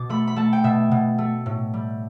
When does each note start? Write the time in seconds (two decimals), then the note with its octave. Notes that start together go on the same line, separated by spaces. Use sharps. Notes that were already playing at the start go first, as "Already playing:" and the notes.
Already playing: B2 D6
0.09 A3 B5
0.27 B5
0.36 A3 A5
0.53 G5
0.64 B2 E5
0.91 B2
1.18 A3
1.46 A2
1.73 G3